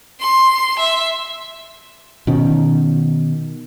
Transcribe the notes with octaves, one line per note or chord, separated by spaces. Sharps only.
C6
E5
B2 D#3 C#4